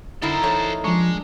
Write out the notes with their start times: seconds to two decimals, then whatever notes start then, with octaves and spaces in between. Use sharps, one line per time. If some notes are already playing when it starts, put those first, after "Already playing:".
0.22 D3 D#4 E4 A4 A#4 C5 F#5
0.43 E3 A3 C#5
0.84 F3 G#3 D4 C#6